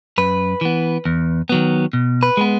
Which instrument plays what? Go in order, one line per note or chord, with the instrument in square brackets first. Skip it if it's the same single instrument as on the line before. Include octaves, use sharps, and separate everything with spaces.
[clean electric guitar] F#2 B4
E3 B3
E2
D#3 F#3 B3
B2
B4
G#3 B3